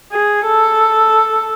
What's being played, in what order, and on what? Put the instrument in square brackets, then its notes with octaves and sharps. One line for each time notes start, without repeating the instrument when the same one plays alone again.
[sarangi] G#4
A4